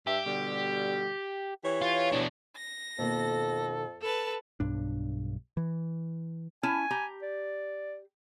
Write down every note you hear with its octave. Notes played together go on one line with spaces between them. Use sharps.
G2 G4 E5
B2 D3 G3
E3 G4 C#5
F4
B2 D4
A#6
F2 B2 D#3 A#3 A4
A4 B4 A5
B1 G2 D4
E3
C#4 E4 G#5 A5
G4 A#5
D5